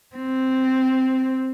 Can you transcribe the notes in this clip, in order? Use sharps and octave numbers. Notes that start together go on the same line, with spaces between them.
C4